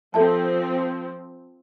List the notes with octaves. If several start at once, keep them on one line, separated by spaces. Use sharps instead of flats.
F3 C4 A4 E5 A5